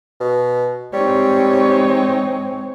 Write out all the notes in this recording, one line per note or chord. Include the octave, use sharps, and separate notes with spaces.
B2
G3 G#3 C4 D#4 C#5